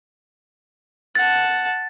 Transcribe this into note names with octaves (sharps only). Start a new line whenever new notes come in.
F#5 A5 A6